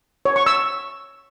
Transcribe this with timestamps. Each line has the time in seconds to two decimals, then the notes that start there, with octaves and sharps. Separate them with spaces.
0.25 C#5
0.36 C#6
0.46 E6